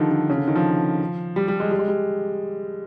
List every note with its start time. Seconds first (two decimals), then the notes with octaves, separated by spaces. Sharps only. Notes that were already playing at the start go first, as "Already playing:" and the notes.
Already playing: D3 D#3 F3 G3
0.11 D3
0.30 C#3
0.38 D3
0.47 D#3
0.56 F3
1.36 G3
1.48 G3
1.60 G#3
1.71 G3
1.79 G#3
1.88 G3